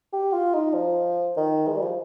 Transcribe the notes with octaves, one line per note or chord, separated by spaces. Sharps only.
G4
F4
D#4
F3
D#3
G#3
G3
F3